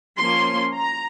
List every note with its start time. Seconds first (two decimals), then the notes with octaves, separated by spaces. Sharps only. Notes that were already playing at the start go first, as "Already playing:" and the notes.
0.18 F3 A#3 C#4 C6
0.74 A#5